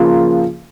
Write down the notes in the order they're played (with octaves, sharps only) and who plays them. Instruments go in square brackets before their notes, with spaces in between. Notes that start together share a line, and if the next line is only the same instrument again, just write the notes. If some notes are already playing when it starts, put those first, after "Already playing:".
Already playing: [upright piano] C#3 F3 A#3 F4